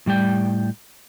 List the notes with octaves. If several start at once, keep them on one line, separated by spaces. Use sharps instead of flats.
A2 G3 D5 G5